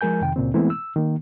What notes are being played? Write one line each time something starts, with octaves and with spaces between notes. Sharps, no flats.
F3 G#3 A#4 G#5 G6
F2 C3 D#3 G5
C#2 A#2 C#3 C4
E3 G#3 A3 B3 C4 E4
E6
D#3 A#3